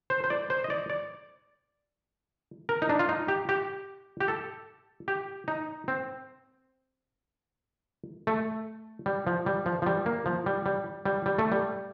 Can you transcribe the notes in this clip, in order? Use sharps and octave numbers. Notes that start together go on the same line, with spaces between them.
C5
C5
D5
C5
D#5
D5
D5
A#4
D#4
D4
F4
D#4
G4
G4
G4
A4
G4
D#4
C4
A3
G3
F3
G3
F3
F3
G3
A#3
F3
G3
G3
G3
G3
A3
G3